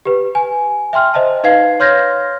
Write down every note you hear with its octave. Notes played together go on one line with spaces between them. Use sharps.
G4 B4
G#5
E5 G5 C6 F6
C5 D#5 E5 A5
D#4 B4 F5 G#6 C7
C#5 C6 F6 G6 G#6 A#6